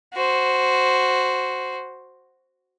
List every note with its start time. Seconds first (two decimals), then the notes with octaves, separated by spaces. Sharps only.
0.15 F#4 C5